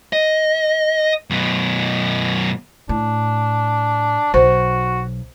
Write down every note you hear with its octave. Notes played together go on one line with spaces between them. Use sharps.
D#5
F#2 B2
A2 D4
B1 F#4 C5